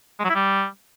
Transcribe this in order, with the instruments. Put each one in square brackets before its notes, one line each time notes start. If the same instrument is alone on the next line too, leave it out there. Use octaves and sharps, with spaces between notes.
[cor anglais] G#3
F#3
E4
G3